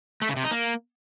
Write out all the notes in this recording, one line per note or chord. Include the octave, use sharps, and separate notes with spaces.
A3
C#3
C3
D#4
A#3